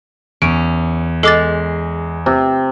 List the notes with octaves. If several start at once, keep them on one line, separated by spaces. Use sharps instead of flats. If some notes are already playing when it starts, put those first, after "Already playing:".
E2 C#4 D7
G#3 A4 D6 A6
C3